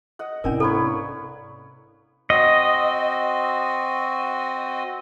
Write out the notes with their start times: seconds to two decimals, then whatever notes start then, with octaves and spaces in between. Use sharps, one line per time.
0.19 D#5 F#5
0.44 G#2 C3 C#4 D4 E4 A#4 D5
0.60 A#3 A4 B4 C#5
2.30 C4 F#4 D#5